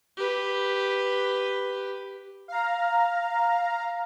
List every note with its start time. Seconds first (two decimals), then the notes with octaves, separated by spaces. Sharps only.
0.17 G4 B4
2.48 F5 A#5